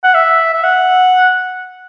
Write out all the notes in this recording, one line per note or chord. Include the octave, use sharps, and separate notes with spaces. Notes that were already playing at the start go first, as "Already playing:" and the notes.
F#5
E5
E5
F#5